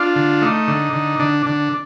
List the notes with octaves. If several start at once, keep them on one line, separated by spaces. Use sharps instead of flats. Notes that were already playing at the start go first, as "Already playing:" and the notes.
Already playing: D4 F4
D3
A3 D#4
D3
D3
D3 D4
D3 D4